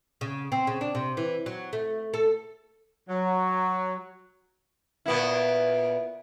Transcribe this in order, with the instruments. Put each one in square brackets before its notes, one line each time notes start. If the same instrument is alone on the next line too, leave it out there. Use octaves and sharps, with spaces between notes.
[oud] C#3
C4
C#3
D4
C3
E3
F#3
A3
A4
[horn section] F#3
[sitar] A#2 B3 E4